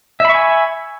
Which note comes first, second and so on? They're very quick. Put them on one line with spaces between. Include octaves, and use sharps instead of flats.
E5 B5 C#6 G#5